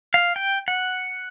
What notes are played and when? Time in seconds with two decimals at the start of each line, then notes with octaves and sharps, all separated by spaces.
0.14 F5
0.36 G5
0.68 F#5